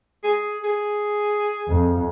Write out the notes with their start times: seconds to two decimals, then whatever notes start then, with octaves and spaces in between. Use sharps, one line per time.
0.24 G#4
0.64 G#4
1.68 F2